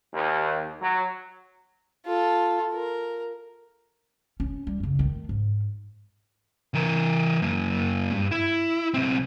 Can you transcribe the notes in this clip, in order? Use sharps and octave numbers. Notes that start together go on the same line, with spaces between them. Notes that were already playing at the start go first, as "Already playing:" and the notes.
D#2
F#3
F4 A4
A#4
C#4
G3
F#2 C#3
D#3 A3
G#2
E3 A#4
F#2 A#3
G2
E4
B1 C4